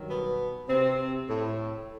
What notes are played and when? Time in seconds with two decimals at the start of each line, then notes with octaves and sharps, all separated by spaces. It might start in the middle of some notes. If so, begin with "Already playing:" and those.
Already playing: G2 D#3 F#3
0.08 B2 B3
0.68 C3 C4
1.29 A2 A3